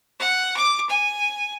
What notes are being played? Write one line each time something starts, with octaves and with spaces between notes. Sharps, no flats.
F#5
D6
G#5